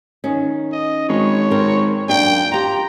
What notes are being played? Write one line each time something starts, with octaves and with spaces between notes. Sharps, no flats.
D#3 C#4
D#5
G#1 C#5
C4 A#4
F#2 A#3 D4 G5
F4 G4 A#5